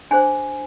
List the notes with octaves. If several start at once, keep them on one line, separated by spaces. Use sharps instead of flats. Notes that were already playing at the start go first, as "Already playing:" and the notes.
D4 G#4 C5 G#5